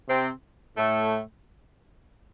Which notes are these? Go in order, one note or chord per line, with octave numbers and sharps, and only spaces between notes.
C3 C4
A2 A3